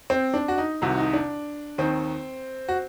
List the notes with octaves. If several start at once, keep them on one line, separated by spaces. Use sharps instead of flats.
C4
D4
F#4
D#4
C2 C3 D#3 F#4
D#4
D4
D#2 D#3 C4
F#4